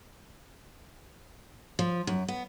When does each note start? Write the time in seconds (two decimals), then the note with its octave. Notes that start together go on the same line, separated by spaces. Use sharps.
1.79 F3
2.07 F#2
2.28 B3